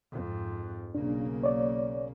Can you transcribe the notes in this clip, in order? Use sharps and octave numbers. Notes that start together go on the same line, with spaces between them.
F2 G#2
B1 C#3 A#3 D4
C#5 D5